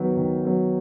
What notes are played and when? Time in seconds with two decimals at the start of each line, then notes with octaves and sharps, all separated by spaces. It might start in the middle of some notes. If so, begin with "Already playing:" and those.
Already playing: D#3 F#3 B3
0.17 D#3
0.45 F#3 B3